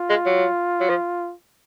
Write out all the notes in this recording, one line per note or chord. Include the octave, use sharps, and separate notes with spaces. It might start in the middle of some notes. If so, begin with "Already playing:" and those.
Already playing: F4
G#3
F#3
F#3
F3